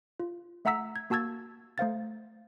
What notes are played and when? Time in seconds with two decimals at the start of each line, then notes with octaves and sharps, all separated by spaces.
0.20 F4
0.65 A3 E5 F#5 A#5 E6 B6
0.96 G#6
1.10 A#3 F#4 A5 E6 G#6 A6
1.78 A3 C5 F5 A6